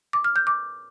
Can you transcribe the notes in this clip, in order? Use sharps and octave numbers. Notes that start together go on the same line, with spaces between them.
D6
F6
G6
D6